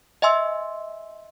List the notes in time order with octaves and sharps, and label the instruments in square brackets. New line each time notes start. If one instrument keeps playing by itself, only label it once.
[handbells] D#5 E5 G#5 C6 E6